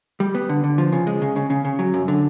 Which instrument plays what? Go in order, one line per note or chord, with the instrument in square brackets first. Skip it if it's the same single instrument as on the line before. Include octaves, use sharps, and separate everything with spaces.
[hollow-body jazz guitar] G3
B3
D3
D3
F3
C#3
G#3
C#3
C#3
C#3
C#3
F#3
F#2
D3